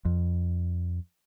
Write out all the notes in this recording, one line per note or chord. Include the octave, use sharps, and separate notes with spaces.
F2